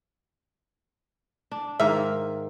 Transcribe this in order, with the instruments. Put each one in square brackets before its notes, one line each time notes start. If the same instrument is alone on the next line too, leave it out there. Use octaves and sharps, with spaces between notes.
[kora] D4
[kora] G#2 D#3 [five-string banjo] E5 F5